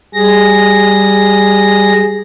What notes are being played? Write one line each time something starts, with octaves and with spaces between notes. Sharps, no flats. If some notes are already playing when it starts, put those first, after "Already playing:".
G3 G#4 A#6